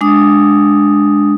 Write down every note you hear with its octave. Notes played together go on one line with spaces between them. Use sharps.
G#3 D4 D#6